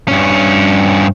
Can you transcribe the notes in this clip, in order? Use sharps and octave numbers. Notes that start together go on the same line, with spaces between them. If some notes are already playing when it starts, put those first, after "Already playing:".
G2 C#4